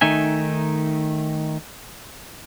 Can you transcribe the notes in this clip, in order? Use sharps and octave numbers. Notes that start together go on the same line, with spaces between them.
D#3 A3 D#4 E5 G#5